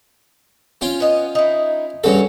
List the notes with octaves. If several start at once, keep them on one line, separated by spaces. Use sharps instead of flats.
C#4 F4 G5
B3 D#5
D#4 E4
G2 C#3 F#4 A4 C5 C#5